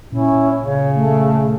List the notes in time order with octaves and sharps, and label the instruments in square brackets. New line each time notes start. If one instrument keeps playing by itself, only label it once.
[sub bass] A#2 [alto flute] C#4 [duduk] E4
[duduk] C#3 [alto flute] C#5
[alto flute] A3